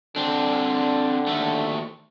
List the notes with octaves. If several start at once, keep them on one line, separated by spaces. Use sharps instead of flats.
D3 C4 D4
D#2 A3